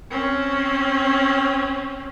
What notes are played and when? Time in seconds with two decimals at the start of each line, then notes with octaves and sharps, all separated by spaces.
0.11 C4 C#4